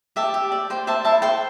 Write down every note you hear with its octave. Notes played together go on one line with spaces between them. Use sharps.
G4 E5 A5
G4
D5
C5 G5
C5 E5 A5
E4 E5 A5
C5 G5 C6